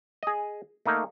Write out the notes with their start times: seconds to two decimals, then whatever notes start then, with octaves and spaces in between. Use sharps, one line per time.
0.23 G#4 D#5
0.86 A3 A#3 D#4